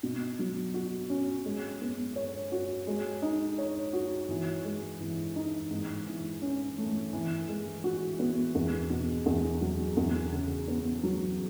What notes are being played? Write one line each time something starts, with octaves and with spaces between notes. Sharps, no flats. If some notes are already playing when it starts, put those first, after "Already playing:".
B2
F#3
F#4
C#4
G#3
B3
C#5
F#4
G#3
D#4
C#5
F#4
E3
G#3
E3
D#4
G#2
E3
C#4
A3
E3
G#3
F#4
B3
E2
B2
E2
F#3
E2
C#3
B3
F#3